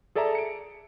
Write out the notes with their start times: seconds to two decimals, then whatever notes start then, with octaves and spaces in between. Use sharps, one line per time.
0.15 G#4 A4 D5 E5 A5 A#5
0.35 C#7 D7